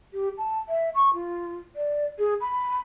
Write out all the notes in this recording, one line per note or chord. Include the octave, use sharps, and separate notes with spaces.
G4
A5
E5
C#6
F4
D5
G#4
B5